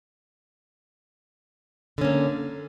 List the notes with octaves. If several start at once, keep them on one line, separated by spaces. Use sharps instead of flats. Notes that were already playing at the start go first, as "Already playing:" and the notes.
D3 A#3 C#4